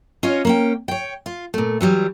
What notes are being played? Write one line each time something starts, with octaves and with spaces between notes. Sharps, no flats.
C#4 F4 C#5 D#5
A#3 C#4 G5
C#5 G5
F4
A#2 A3
E3 F#3 G3